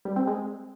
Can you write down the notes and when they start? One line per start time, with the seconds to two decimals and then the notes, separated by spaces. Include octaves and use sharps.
0.05 G3
0.16 C4
0.27 G#3